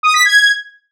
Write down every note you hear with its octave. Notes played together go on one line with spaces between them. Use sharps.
D#6
B6
G#6